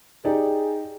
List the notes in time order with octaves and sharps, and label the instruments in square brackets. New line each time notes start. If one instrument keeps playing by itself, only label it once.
[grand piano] D#4 G4 D5 [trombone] G#4